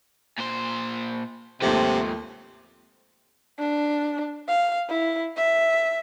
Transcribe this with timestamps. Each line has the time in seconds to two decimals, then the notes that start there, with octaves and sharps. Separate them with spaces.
0.38 A#2 C5
1.62 D#2 G#2 C3 F3 A3
3.59 D4
4.48 F5
4.89 E4
5.36 E5